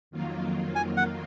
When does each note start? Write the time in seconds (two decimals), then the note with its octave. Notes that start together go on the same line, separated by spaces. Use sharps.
0.11 F2 D#3 F#3 A#3 F4
0.75 G#5
0.97 F#5